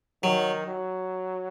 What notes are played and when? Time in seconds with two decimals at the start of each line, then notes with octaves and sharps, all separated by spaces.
0.23 D#3 F#3
0.66 F#3